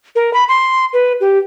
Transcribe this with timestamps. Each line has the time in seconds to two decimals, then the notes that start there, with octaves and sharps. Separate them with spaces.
0.15 A#4
0.33 B5
0.48 C6
0.93 B4
1.21 G4